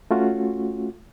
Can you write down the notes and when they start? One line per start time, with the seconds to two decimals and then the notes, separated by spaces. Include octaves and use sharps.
0.11 A3 C#4 F4 F#4